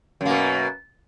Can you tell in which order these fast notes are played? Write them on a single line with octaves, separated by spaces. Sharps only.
F#2 A#3 B2